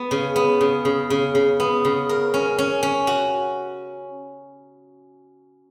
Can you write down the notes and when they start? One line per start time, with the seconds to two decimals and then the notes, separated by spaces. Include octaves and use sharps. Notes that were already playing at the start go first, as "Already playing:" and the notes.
Already playing: B3
0.11 C#3
0.36 B3
0.61 C#3
0.85 C#3
1.10 C#3
1.35 C#3
1.60 B3
1.85 C#3
2.09 A#4
2.34 C#4
2.58 C#4
2.83 C#4
3.07 F#4